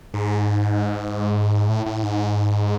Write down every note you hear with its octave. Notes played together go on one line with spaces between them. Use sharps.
G#2
A2
A2
G#2